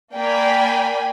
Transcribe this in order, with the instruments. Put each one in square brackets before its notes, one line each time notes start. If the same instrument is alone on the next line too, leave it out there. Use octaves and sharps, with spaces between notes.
[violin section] A#3 D5 G5 G#5 B5